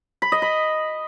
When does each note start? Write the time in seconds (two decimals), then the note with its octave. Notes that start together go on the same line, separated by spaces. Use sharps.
0.22 B5
0.32 D#5
0.42 B5